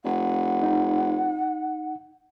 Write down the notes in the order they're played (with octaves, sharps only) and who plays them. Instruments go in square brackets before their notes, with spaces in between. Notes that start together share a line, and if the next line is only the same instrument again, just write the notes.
[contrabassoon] F1 [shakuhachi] F#5
[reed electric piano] D#4